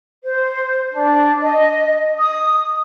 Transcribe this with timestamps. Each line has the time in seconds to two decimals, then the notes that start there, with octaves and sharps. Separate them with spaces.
0.24 C5
0.91 D4
1.41 D#5
2.18 D#6